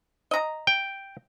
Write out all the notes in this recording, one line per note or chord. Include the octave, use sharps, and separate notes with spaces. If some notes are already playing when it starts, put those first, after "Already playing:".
D#5 A#5
G5